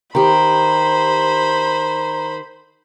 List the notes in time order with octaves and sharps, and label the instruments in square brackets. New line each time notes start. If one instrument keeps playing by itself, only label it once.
[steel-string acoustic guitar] D#3 G4 [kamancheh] C5 B5 [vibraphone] A#5